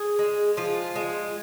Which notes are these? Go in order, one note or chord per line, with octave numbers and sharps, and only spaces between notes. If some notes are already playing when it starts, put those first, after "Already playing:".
Already playing: G#4
G#3
F3 F4
G#3